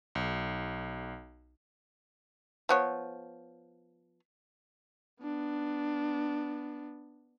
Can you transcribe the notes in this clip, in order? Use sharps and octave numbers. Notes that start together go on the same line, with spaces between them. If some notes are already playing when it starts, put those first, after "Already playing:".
B1
F3 B3 C#5
B3 D4